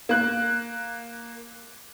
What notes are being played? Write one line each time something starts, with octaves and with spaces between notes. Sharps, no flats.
A#3 F#6